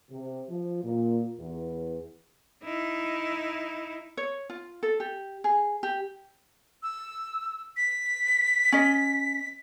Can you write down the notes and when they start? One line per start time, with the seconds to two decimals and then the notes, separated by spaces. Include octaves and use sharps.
0.11 C3
0.50 F3
0.83 A#2
1.40 E2
2.64 D#4 E4
4.17 C#5
4.50 F4
4.83 A4
5.00 G4
5.44 G#4
5.83 G4
6.83 E6
7.77 B6
8.72 C#4 D#5